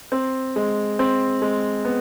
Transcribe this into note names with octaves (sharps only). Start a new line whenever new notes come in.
C4
G#3
C4
G#3
B3